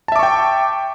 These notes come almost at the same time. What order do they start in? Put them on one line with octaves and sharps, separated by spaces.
A5 E5 D6 C#6 G5